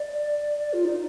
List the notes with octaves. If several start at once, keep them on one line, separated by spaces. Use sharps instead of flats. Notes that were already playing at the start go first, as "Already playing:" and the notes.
Already playing: D5
F4
D#4